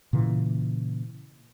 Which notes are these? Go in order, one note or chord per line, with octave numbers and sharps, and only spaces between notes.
A#2 C#3 E3